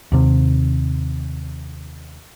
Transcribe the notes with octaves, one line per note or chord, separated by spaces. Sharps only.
D#2 C3